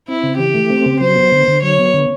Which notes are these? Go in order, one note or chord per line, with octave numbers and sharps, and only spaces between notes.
C4 E4
C#3
E3 G4
A3
C4
C#3
F#3 C5
B3
D3
D3
F#3 C#5
B3
D3